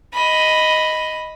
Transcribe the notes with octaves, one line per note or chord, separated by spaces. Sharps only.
D#5 B5